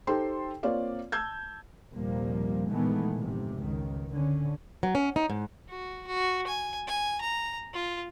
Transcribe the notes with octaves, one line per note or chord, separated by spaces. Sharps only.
D#4 G4 A4 C5 G5 C6
A#3 C4 F4 C#5 D5 F5
A5 E6 G6 G#6
A#1 D#2 C3 F3 G3 A#3
A#2 D#3 E3 G#3 A3 B3
F1 A#1 G#2 C3
C#2 D#3
D3 C#4
F#3
C#4
D#4
G#2
F#4
F#4
G#5
G#5
A#5
F4